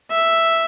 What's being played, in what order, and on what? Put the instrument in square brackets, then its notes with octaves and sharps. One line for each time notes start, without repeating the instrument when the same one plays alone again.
[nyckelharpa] E5